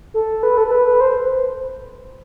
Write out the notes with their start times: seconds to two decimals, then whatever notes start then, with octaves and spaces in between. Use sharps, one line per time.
0.14 A4
0.43 B4
0.57 A4
0.67 A4
0.71 B4
0.87 B4
1.01 C5